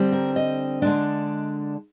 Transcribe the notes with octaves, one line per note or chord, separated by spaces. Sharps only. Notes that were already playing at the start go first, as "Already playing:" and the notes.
Already playing: D3 G3 C4
A#4
D#5
D3 G#3 D4